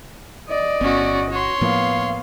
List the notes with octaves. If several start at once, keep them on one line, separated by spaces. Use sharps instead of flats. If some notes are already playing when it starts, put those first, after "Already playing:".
D5 D#5
G1 B3 C#4 F#4
F#4 C#5 C6
A2 F3 A#3 B3 F5